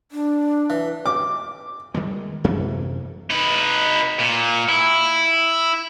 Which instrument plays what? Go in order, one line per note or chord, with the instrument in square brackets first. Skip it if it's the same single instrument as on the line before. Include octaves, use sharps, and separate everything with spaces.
[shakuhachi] D4
[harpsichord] E3
[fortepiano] D6
[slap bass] D#3 G3 G#3
F#2 C3 E3
[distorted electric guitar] D#4 B4
A#2
E4